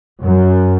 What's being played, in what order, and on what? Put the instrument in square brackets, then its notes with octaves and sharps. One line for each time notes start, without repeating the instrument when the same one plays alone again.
[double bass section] F#2